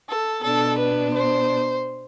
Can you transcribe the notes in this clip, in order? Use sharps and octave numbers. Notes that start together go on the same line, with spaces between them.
A4
B2 B3 D4 A4
B4
C5